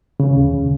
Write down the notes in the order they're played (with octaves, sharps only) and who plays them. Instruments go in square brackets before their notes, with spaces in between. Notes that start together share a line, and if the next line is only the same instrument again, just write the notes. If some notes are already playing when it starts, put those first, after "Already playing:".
[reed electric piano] C#3
D#2